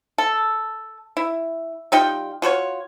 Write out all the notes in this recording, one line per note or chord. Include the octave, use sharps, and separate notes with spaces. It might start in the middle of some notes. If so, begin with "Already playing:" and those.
A4
E4
G3 D#4 F4 G5
F4 F#4 B4 C#5